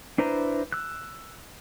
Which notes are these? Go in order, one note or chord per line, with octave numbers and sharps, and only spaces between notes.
D4 E4 B4 C5 A#5
E6 F#6